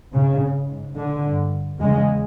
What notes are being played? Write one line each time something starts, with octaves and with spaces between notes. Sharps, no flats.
G#2 C#3
G#2
D3
G2
E2 C#3 G#3